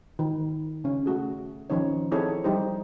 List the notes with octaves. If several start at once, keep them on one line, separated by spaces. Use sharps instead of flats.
D#3
C#3 C#4
A3 F#4 G#4
D#3 F3 C#4 D#4 C#5
C4 D#4 E4 G#4 A4 C#5
F3 G3 D#4 G4 C5